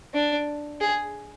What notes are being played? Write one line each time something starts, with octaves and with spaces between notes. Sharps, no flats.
D4
G#4